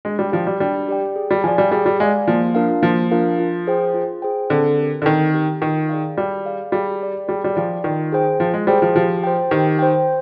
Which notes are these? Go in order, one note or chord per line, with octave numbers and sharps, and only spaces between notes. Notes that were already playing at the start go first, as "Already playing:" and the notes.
G#3 D4
G3
F3 G4 D5 G5
G3
G3 D4
G4 D5 G5
G#4
G3
F3 D5 F5 G#5
G3
G3 G#4
G3
G#3 D5 F5 G#5
F3 A#3
D4 F4 A#4 F5
F3 A#3
D4 F4 A#4 F5
F4
G#4 C5 G5
F4
G#4 C5 G5
D3 C4
G4 A#4
D3
D#3 C4
G4 A#4
D#3 F4
G#4 D5 F5
G3 F4
G#4 D5 F5
G3 G#4
D5 G5
G3 G#4
G3
F3 D5 G5
D#3 F4
G#4 C5 G5
F3 F4
G#3
G3 G#4 C5 G5
F3
F3 G4
C5 G5
D#3 G4
C5 G5